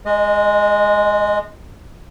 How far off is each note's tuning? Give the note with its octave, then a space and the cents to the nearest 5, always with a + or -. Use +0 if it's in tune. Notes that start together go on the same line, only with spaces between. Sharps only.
G#3 +0 D#5 -30